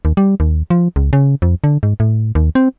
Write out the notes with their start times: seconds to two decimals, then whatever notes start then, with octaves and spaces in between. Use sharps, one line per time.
0.05 D#2
0.17 G3
0.40 D#2
0.70 F3
0.96 C#2
1.13 C#3
1.42 F2
1.64 D3
1.83 G#2
2.00 A2
2.35 D#2
2.55 C4